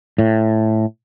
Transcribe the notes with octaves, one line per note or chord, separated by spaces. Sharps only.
A2